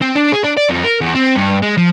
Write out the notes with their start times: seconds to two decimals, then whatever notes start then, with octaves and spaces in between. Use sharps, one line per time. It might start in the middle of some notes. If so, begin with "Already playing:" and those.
0.01 C4
0.15 D4
0.32 G#4
0.44 D4
0.57 D5
0.69 F2
0.84 A#4
1.01 E2
1.15 C4
1.36 G2
1.63 G#3
1.78 F3